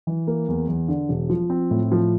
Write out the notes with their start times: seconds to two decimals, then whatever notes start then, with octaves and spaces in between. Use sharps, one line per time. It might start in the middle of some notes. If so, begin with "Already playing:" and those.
0.07 E3
0.27 A#3
0.48 E2
0.68 E2
0.88 D3
1.09 E1
1.30 F3
1.50 C4
1.71 A2
1.92 F3